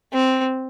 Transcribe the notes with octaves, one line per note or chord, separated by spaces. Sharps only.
C4